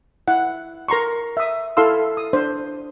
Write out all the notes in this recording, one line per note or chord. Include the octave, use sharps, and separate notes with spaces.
E4 F#5
A#4 A#5 C6 C#6
E5 D#6
E4 A4 F5 C6 E6
D#6
D4 C5